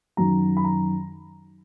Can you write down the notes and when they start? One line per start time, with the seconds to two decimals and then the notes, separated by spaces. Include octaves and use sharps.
0.17 F#2 D#3 F#3 A#5
0.57 B5
0.64 A#5